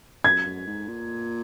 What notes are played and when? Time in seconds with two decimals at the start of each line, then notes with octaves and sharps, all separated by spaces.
0.24 F#2 G#6
0.46 F#2
0.67 G#2
0.88 A#2